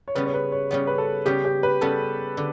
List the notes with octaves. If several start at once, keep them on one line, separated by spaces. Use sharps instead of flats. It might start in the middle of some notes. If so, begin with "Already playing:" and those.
C#5
C#3 G3 B3 B4
C#5
B4
C#5
C#3 G3 B3 C#5
B4
A4
C#3 G3 B3 G4
G4
B4
C#3 G3 B3 A4
D3